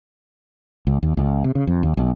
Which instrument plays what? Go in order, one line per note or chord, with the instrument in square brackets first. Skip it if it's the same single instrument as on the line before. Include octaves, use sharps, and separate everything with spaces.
[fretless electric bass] C#2
D#2
C#2
C3
C#3
F2
D#2
B1